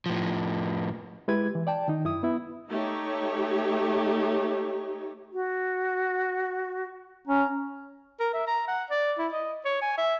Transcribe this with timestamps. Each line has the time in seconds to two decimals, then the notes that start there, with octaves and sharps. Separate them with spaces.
0.06 A2 F3
1.28 G#3 E4 G4 B4 G#6
1.55 E3
1.67 D5 G5 A5
1.88 D#3 D#4
2.04 F#2 E4 D#6
2.23 B3 E4
2.69 A3 D#4 G4 C#5
5.33 F#4
7.27 C#4 A#5
8.20 A#4
8.33 E5
8.47 A#5
8.68 F#5
8.90 D5
9.18 E4
9.33 D#5
9.65 C#5
9.82 G#5
9.97 E5